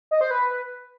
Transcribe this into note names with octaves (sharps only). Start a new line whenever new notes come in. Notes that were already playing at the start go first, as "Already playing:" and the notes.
D#5
C5
B4